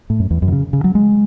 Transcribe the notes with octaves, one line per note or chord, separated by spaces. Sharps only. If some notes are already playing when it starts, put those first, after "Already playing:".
A2
F#2
E2
F#2
D#3
C#3
C#3
F#3
G#3